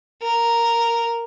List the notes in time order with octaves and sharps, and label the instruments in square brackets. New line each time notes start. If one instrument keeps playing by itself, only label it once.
[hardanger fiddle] A#4